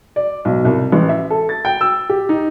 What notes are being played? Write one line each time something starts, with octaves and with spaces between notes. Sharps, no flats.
D5
B1
C2
A1
E5
A4
A6
G5
E6
G4
D#4